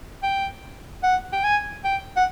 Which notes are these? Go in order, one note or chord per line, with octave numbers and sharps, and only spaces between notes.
G5
F#5
G5
G#5
G5
F#5